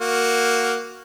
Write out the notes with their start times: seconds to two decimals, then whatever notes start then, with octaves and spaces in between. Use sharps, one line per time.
0.01 A#3 F#4